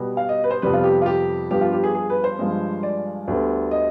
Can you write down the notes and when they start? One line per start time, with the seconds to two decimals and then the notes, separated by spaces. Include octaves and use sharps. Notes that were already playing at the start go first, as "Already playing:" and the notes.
Already playing: B2 G3 B3
0.17 F5
0.29 D#5
0.44 B4
0.51 C5
0.62 F2 C3 G3 B3 B4
0.74 F4
0.84 G4
1.02 F4
1.06 G4
1.50 G2 F3 B3 G4
1.61 F4
1.73 G4
1.83 G#4
1.95 G#4
2.10 B4
2.24 C5
2.39 G2 F3 G#3
2.83 D5
3.28 D2 D3 G3 B3
3.71 D#5